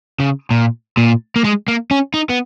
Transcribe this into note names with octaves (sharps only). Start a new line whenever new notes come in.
C#3
A#2
A#2
A#3
G#3
A#3
C#4
D#4
B3